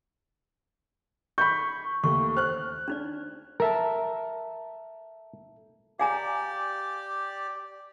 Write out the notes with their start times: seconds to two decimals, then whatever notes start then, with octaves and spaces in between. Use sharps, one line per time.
1.38 B5 C#6 G6
2.04 D#2 A3 C#6
2.37 C5 F6 F#6
2.88 D4 D#4 D5
3.60 A4 A#4 E5 A5
6.00 G4 D5 F5 G#5 A#5